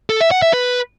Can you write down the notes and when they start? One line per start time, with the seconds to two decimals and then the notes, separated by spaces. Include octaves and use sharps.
0.10 A4
0.21 E5
0.31 F#5
0.42 E5
0.53 B4